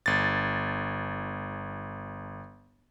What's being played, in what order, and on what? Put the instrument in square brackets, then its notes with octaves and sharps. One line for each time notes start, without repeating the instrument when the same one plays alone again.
[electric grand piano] G1 A6